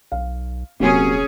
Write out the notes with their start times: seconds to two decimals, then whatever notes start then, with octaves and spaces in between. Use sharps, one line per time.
0.12 B1 F5
0.80 D#1 C3 F#3 A#3 C#4 G#4